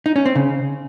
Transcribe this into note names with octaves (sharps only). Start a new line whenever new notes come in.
D#4
C#4
C4
C#3